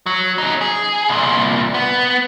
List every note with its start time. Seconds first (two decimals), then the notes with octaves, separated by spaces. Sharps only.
0.06 F#3
0.38 C#4 D#4
0.61 G#4
1.08 C2 A#2
1.74 B3